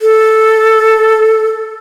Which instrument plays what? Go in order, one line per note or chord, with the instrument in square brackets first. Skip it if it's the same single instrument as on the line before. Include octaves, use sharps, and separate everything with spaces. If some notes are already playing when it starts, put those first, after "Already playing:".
[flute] A4